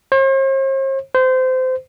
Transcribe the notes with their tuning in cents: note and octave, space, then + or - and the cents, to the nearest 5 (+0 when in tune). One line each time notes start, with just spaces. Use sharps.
C5 +45
C5 -25